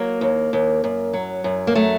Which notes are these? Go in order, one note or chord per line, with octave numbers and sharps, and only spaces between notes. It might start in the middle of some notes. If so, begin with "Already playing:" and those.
Already playing: F#3 A#3
D#2
D#2
F#2
F#3
F#2
A#3
F#3 A3